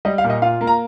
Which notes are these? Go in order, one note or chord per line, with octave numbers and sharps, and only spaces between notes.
G3 D#5
F5
A#2
D#5
F4 F5
A#3
A#5